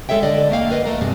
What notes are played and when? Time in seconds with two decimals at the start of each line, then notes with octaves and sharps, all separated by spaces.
0.09 G#3 A4 C#5 E5 G5
0.23 D3 D5 D#5
0.51 A3 A#3 F5 G5
0.70 A#4 B4 D#5
0.85 D2 A3 A#4
1.01 G2 C3 G#3